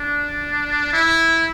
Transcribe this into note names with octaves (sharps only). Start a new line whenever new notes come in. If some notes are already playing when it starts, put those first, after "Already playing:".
Already playing: D4
E4